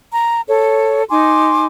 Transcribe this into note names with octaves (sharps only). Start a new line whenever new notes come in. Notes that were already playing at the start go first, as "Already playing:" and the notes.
A#5
A4 C#5
D#4 G#5 C6 D6